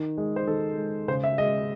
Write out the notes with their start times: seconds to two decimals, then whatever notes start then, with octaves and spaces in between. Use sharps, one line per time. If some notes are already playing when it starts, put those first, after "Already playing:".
Already playing: D#3
0.18 G#3
0.36 C5
0.47 D#3 A4
0.77 G#3
1.08 C#3 C5
1.24 E5
1.38 G#3 D#5